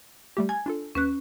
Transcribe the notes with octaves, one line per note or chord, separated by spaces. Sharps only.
G3 A3 G4
G#5 G#6
D4 F4 A4
D#2 C#4 B4 F#6